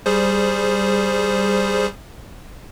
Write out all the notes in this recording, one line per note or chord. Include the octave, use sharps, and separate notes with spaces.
G3 G#4 C5